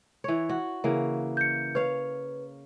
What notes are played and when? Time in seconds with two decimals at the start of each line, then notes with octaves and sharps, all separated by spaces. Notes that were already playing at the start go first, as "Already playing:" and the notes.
0.24 E3 C#5
0.49 F#4
0.84 C#3 E3 A#3
1.37 G6 C#7
1.75 B4 C#5 F5